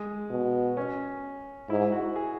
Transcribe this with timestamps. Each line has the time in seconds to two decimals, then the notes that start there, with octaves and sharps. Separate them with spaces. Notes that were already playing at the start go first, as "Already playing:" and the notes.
Already playing: G#3
0.30 B2
0.77 C#4
1.69 G#2 E4
1.92 F#4
2.16 G#4